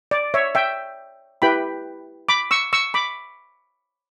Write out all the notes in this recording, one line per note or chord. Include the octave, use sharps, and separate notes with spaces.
D5
C#5 E5
E5 G5
E4 G4 B4 G5 B5
B5 D6
C#6 E6
C#6 E6
B5 D6